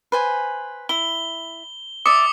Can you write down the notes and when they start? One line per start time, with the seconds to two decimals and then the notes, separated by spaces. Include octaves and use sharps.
0.12 B4 C5 G#5
0.89 E4 G7
2.06 D5 E5 D6 D#6 C#7